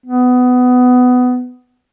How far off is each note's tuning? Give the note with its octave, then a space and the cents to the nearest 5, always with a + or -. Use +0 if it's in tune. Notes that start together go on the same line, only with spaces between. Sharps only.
B3 +15